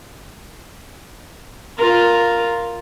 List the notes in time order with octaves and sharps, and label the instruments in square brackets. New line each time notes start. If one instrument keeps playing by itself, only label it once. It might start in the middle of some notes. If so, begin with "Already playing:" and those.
[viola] F4 A#4